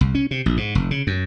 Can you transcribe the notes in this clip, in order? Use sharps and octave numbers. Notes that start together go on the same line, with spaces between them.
C2
C#4
C3
A#1
G#2
F1
C#3
F#2